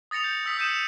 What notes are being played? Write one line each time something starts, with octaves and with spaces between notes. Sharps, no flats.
D#6 A6 A#6 C#7 F7
G6
D#6 E6 B6
D#6 E6 G6 C#7 D#7 E7